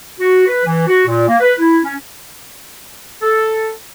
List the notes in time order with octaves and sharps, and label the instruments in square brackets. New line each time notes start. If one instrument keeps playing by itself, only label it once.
[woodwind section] F#4
B4
E3
F#4
A#2
A#3
B4
E4
C#4
A4